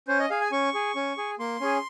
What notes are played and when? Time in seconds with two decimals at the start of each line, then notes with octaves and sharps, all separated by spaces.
0.08 C#4 C5
0.19 D#5
0.30 G#4 F5
0.41 G#5
0.52 C#4 C#6
0.74 G#4
0.96 C#4
1.18 G#4
1.39 A#3 C6
1.61 C#4 G#4